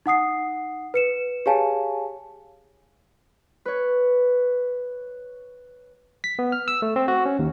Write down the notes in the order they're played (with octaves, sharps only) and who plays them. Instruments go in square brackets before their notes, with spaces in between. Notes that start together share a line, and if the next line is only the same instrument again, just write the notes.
[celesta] D#4 F#5 D#6 C7
B4 C#7 E7
G4 G#4 C#5 F5 G#5 A5
[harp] B4 C#5
[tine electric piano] B6
B3
F6
E6
A3
C4
F#4
C#4
D#2